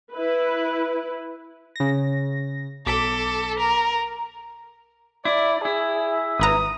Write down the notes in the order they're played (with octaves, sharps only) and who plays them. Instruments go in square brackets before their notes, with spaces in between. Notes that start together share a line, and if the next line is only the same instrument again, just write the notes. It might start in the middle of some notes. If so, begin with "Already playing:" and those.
[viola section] E4 B4
[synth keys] C#3 A#6
[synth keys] B1 D6 B6 [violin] A4
[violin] A#4
[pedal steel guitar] E4 [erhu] D5
[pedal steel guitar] E4 [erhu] G#4
[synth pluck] G#1 B4 A#5 [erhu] D#6